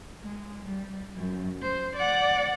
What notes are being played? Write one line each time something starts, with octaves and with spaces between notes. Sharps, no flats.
G#3
G3
F#2
C5
D5 F#5